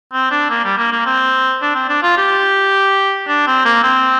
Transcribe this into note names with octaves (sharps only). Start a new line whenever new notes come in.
C4
D4
A#3
G3
A#3
A#3
C4
D4
C4
D4
F4
G4
D4
C4
A#3
C4